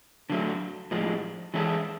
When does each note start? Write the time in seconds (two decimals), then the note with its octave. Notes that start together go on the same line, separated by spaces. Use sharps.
0.30 D3 F#3 A3
0.91 A2 F3 G#3
1.54 E3 G#3 C#4 E4 A4